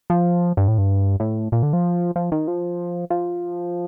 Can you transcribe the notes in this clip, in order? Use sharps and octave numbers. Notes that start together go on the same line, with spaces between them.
F3
G2
A2
G2
A2
A#2
D3
F3
F3
D#3
F3
F3